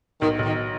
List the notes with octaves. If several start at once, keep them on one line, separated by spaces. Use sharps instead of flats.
B1 D#3
B1
D#3